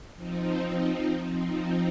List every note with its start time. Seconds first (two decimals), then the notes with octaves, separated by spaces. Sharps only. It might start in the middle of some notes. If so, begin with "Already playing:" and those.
0.16 F3 C4 D#4
1.30 F3 C4 D#4